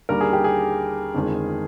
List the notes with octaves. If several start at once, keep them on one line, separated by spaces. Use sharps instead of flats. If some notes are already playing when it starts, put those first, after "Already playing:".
D#2 D3 G3 A#4
G#4
G4
G#4
G1 F2 D#3 G#3